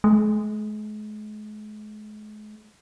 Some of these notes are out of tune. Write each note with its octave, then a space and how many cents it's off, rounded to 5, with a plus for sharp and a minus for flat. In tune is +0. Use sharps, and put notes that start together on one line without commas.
G#3 +40